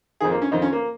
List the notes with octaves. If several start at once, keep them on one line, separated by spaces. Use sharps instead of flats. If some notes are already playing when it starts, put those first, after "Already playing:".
F2 D#3 G#4
A#3
C#4
F2 D#3 D#4
C#4
A#3